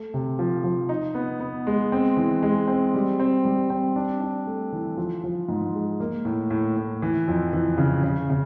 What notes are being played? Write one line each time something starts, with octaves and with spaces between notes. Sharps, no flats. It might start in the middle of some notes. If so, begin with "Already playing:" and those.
Already playing: A3
C3
F3
F3
D#4
B3
B3
G#3
C4
E3
G#3
C4
G3
C4
G3
C4
D4
D4
A3
E3
F3
F3
G#2
G#3
A#3
A2
A2
A2
E3
F2
E3
C#3
C#3
C#3